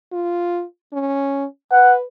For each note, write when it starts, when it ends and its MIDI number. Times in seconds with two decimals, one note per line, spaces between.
0.12 0.64 65
0.93 1.45 61
1.71 2.04 71
1.71 1.94 78